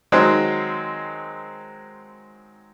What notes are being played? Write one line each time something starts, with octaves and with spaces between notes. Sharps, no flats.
D#3 F#3 G#3 C4